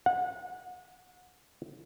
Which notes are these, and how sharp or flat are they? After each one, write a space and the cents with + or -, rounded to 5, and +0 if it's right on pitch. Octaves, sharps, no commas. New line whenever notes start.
F#5 -30